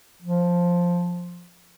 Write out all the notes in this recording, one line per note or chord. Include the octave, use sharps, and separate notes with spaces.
F3